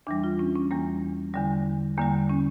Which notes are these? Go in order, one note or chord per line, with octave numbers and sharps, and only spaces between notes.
E2 E3 G3 D4
F4
C#4
C#4
E2 E3 G3 A#3
E2 D3 G3
E2 D3 G3 A#3
C#4